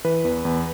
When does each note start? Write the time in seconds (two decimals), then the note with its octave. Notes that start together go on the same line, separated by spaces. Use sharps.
0.04 E3 B4
0.25 E2
0.45 E2